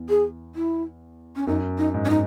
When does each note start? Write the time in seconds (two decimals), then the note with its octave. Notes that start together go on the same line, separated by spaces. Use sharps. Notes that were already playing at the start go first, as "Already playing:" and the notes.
Already playing: E2
0.09 G#4
0.55 E4
1.36 C#4
1.47 F#2 D#4
1.78 D#4
1.94 G#2
2.05 C#4
2.09 D#4